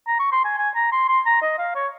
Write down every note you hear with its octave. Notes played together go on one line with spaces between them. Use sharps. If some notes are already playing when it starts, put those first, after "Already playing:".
A#5
C#6
C6
G#5
G#5
A#5
C6
C6
A#5
D#5
F5
C#5